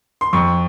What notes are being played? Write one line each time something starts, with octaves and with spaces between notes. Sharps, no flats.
C6
F2 C#6